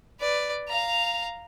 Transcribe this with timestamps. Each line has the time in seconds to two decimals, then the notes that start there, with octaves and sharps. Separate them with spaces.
0.20 B4 D5
0.68 F5 A#5